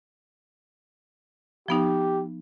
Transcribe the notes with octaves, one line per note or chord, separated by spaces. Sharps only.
F3 B3 D#4 G4